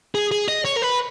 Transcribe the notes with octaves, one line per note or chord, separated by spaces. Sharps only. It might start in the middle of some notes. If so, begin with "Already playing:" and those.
G#4
G#4
D#5
C#5
A#4
B4